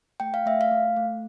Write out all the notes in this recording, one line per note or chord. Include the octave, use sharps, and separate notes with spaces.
A3 G5
F5
A3 E5
F5
A3
A3